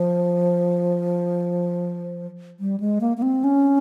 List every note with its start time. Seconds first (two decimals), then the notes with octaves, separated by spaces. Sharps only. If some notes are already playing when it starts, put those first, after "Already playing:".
Already playing: F3
2.60 G3
2.80 G#3
3.01 A#3
3.17 A#3
3.22 C4
3.44 C#4